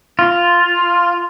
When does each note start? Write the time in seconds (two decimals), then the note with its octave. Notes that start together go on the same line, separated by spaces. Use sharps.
0.19 F4